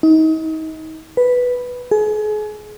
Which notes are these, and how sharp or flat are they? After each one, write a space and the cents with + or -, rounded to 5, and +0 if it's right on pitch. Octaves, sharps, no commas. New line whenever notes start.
D#4 +35
B4 +0
G#4 +35